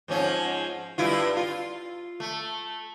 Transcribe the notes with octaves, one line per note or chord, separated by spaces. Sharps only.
G#2 F3 C#4
G2 E4 F4
F4
A3